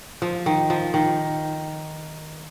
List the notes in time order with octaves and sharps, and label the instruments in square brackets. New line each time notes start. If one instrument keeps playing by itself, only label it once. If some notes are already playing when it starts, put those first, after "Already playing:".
[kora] F3
D#3
F3
D#3